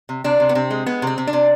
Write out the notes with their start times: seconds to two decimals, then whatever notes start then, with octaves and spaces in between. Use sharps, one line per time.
0.09 C3
0.24 C3 D4
0.40 C3
0.49 B3
0.55 C3 C4
0.71 G#3
0.86 G#3 B3
1.02 C3 C4
1.18 C3
1.27 D4
1.33 C3